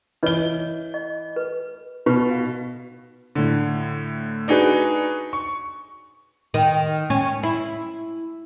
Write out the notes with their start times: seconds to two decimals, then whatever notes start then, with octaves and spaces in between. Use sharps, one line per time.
0.23 E3 B4 C#5 D#5 G7
0.94 D#5
1.36 B4
2.06 B2 B4
2.31 F5
3.35 A2 D3
4.48 D4 D#4 F#4 G#4 B4
5.33 C#6
6.54 D#3
7.10 C#4
7.43 E4